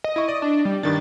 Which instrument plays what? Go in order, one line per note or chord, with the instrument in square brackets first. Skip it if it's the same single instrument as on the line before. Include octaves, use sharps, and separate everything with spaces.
[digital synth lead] D#5
[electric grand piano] E4 C#6
D5
[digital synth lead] D4
G3
[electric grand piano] G2 D#3 D4 [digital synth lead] A6